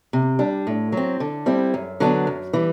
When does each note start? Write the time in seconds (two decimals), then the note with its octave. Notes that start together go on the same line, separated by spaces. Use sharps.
0.13 C3
0.39 G3 D4
0.67 A2
0.92 F#3 C4
1.20 D3
1.46 G3 C4 E4
1.74 F#2
2.00 D3 F#3 B3 D4
2.27 F#2
2.53 E3 G3